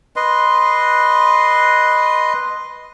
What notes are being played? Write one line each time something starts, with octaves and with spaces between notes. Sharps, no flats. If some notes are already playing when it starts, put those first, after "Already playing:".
B4 D#5 C6